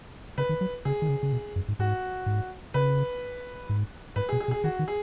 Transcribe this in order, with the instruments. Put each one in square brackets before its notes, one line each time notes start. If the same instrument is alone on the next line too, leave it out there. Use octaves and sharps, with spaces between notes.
[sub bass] C#3 [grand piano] B4
[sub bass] D#3
F#3
[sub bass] C#3 [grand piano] G#4
[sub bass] D#3
C#3
C#3
B2
F#2
G#2
[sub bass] G#2 [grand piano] F#4
[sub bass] G#2
[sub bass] C#3 [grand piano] B4
[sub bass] G#2
[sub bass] G#2 [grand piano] B4
[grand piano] G#4
[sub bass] B2
[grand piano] G#4
[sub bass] B2
[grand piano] G#4
[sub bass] D#3 [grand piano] F#4
[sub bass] D#3
[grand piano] G#4